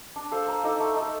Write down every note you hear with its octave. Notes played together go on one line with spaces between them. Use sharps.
D4
A4 C5 F5
A#3
D#4 A4 D5
A3
D#4 A4